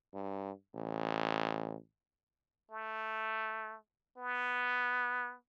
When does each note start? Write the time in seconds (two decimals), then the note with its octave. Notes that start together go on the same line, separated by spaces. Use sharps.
0.14 G2
0.75 A1
2.72 A3
4.18 B3